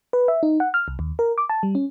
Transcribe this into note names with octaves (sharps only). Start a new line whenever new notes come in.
B4
E5
D#4
F#5
F6
C2
D#2
A#4
D6
A5
G3
C#4